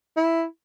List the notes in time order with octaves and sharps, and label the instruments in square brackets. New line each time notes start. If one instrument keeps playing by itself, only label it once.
[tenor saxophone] E4